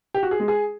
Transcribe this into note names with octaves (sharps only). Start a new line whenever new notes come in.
G4
F#4
G#4
G#3
G#4